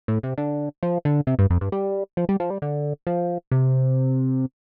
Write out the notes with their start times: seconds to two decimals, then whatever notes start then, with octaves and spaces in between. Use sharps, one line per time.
0.08 A2
0.23 C3
0.38 D3
0.83 F3
1.05 D3
1.27 C3
1.39 G2
1.50 F2
1.61 G2
1.72 G3
2.17 F3
2.29 G3
2.40 F3
2.50 G3
2.62 D3
3.07 F3
3.52 C3